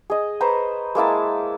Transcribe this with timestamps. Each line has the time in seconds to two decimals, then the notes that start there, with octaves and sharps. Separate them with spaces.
0.10 G#4 D#5
0.40 B4 C5 A#5 C#6
0.95 G#3 A#3 E4 A5